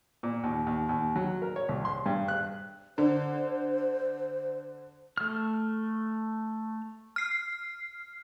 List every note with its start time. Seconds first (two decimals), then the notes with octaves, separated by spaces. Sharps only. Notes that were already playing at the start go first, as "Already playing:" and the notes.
0.23 A#2
0.43 D#2
0.67 D#2
0.89 D#2
1.16 F#3
1.42 A#4
1.56 C#5
1.69 C2
1.85 C6
2.06 G2
2.28 F#6
2.98 D3 C5
5.18 A3 F6
7.16 F6 C7